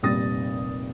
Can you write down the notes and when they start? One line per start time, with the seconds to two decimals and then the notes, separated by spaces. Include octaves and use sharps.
0.03 F1 A#2 G3 D#6 A6 A#6